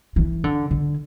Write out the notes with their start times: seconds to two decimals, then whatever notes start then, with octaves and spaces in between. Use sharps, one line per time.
0.16 E3
0.44 D3
0.71 D3